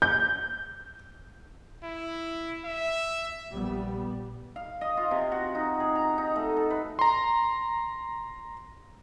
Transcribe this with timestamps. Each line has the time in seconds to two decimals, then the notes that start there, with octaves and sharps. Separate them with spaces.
0.02 G6
1.83 E4
2.65 E5
3.51 A#1 G3 B3
4.56 F5
4.81 D#5
4.97 F4
5.11 C3
5.32 F#4
5.55 D#4
5.80 G#4
5.95 A#5
6.18 D#4
6.36 A3
6.57 A4
6.70 B4
6.99 A#5 C6